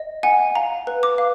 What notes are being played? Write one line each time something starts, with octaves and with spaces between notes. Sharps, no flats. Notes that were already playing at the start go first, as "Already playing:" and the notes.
Already playing: D#5
F#5 G#5
F5 A#5
B4
D6
F5